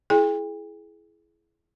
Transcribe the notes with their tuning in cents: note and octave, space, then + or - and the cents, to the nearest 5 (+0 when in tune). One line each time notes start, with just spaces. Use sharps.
E4 +15 G#4 +25 G5 +40